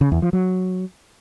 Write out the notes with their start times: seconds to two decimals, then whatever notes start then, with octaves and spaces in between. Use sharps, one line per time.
0.01 C#3
0.12 E2
0.22 F3
0.33 F#3